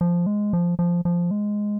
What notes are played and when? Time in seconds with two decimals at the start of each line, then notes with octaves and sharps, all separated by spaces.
0.01 F3
0.26 G#3
0.53 F3
0.79 F3
1.05 F3
1.31 G#3